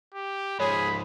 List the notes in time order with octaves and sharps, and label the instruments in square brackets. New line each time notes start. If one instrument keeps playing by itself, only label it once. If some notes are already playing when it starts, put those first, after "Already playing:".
[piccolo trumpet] G4
[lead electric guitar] G#2 F3 [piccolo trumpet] G#4 [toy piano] C#5 [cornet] B5